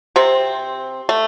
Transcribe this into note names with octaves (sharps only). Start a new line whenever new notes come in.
C3 C4
A3